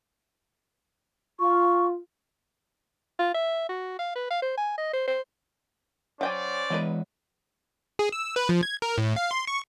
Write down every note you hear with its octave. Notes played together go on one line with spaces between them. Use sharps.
F4 C#6
F4
E5
F#4
F5
B4
F5
C5
G#5
D#5
C5
C5
F#3 C#4 C5 D5 G5 G#5
E3 F#3 G#3 B4 D#5
G#4
E6
B4
F3
G#6
A#4
A2
F5
C6
C#6